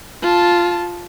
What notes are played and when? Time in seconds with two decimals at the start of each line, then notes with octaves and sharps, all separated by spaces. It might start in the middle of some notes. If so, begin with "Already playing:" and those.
0.22 F4 A5